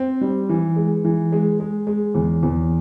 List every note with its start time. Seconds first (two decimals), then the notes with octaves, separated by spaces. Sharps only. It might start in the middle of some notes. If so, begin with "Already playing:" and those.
Already playing: C4
0.21 G3
0.49 E3
0.76 G#3
1.05 E3
1.32 G#3
1.60 G#3
1.87 G#3
2.15 E2
2.43 E2